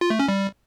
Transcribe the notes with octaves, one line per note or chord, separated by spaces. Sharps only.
F4
A3
C#4
G3